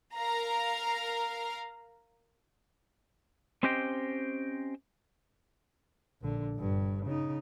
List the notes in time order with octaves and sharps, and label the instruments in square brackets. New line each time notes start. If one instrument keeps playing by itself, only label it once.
[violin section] A#4 F5 A#5
[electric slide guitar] C4 C#4 G4 C5 D#5 G5
[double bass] A#1 D3
G1 G2
C#3 D#4